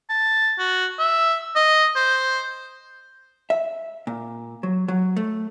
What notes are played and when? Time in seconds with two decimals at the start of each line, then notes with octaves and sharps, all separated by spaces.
0.10 A5
0.59 F#4
0.99 E5
1.56 D#5
1.96 C5
3.50 E5
4.07 A#2
4.63 F#3
4.88 F#3
5.17 A3